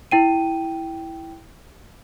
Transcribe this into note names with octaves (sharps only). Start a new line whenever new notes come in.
E4 G5 D#7